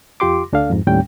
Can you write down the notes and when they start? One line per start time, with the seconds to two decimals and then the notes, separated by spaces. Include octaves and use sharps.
0.20 F2 F4 G4 C6 D6
0.53 D2 D4 A4 F5
0.70 F2 G#2
0.87 D#2 A2 G3 C#4 G5